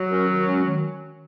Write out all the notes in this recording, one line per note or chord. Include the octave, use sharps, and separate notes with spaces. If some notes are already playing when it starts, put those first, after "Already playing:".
Already playing: F#3
C#4 F#4 A#4
D#3
G#3 C#4
D#3